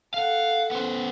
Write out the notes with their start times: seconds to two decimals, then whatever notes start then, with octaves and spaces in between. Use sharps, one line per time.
0.14 A4 F5 F#5
0.71 B3 C5